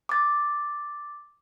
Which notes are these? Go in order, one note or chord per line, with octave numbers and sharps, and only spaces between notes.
D6 A6